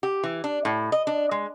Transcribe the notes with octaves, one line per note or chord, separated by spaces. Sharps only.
G4
E3
D4
A2
D#5
D4
G#3